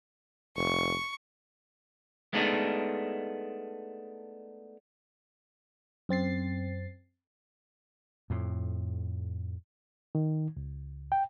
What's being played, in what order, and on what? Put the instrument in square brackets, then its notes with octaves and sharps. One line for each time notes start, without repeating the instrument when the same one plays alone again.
[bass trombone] F1 [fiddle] C#6
[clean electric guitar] G#3 A3 B3 D4 D#4
[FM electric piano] F#2 C4 A6 C7
[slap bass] F2 A2
[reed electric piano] D#3
C#2
G5